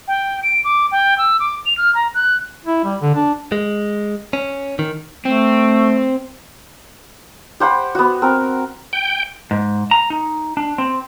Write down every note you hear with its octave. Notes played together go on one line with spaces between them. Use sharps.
G5
D7
D6
G5
E6
D6
F7
F6
A#5
F#6
E4
G3
D3
D4
G#3
C#4
D#3
A3 C4
G4 C5 F#5 B5
B3 F#4
C4 A#4
G5
G#2
A#5
D#4
D4
C4